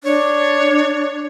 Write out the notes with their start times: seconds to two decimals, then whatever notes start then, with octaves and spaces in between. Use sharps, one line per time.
0.04 D4 C#5